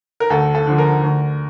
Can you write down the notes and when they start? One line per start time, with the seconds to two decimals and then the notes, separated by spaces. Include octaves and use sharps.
0.20 A#4
0.30 D2 A4
0.55 A4
0.67 D3 F3
0.78 A#4
1.03 D2